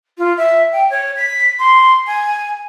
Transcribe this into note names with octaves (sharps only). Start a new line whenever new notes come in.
F4
E5
G5
C#5
B6
C6
G#5